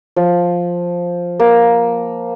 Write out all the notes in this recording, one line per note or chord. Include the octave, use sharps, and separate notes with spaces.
F3
A#3